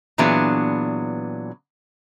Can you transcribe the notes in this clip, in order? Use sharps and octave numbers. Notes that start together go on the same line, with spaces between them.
A#2 E3 F#3 B3 D4 G#4